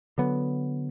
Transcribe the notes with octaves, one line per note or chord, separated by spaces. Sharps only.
D3 F#3 B3